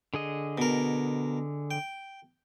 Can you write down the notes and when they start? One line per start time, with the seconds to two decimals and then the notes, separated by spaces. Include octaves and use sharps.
0.14 D3 G#4 D#5
0.58 B2 A#4
1.71 G5